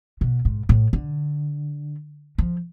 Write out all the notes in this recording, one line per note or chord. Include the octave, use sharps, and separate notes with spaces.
B2
G#2
A2
D3
F3